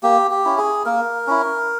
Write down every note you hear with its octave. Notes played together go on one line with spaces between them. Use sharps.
A#3 G4
G4
C#4 E4
G#4
A#3 A#4
C#4 E4